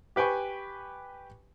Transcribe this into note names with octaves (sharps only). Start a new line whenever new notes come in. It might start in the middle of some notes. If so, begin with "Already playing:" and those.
G4 B4 G5 G#5 C#6